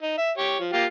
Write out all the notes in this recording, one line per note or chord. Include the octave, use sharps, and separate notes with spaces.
D#4
E5
G4 C#5
F3
A#3 F4 G4